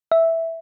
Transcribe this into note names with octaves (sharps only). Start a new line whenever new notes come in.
E5